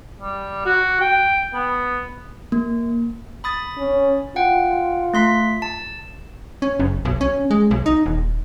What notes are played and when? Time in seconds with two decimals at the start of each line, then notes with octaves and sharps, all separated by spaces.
0.20 G3
0.66 F#4
1.01 G5
1.54 B3
2.52 A#3
3.44 B5 D#6 A6
3.78 C#4
4.36 F4 F#5 G5
5.14 A3 C6 B6
5.62 A5
6.62 C#4
6.80 F#1
7.05 B1
7.21 C#4
7.51 G#3
7.71 B1
7.86 D#4
8.06 D#1